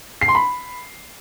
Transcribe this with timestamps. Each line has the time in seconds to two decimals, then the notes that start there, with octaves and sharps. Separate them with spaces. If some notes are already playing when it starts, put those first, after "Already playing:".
0.21 C7
0.28 C6
0.35 B5